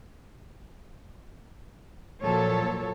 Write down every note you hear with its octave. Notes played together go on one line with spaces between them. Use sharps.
A#2 F3 F#3 A4 C#5